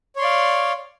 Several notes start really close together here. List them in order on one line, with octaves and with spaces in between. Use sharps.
C#5 C6 D5 F5